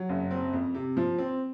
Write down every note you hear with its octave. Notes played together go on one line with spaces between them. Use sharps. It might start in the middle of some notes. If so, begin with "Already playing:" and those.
Already playing: F#3
F#1
C4
F2
C3
F3
C4